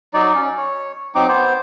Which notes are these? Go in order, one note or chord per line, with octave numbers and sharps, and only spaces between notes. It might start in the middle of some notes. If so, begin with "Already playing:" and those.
F#3 D#4 D5
C#4
C#5
F#3 C4 D#4 D6
B3 C5